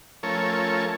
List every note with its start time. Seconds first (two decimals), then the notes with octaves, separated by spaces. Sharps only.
0.23 F3 A3 C#4 A4 A#4 C#5